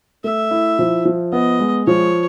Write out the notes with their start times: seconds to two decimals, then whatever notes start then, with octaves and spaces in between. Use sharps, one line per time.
0.24 A3 E5
0.51 E4
0.79 F3
1.05 F3
1.33 B3 D#5
1.60 G#3
1.87 F3 C#5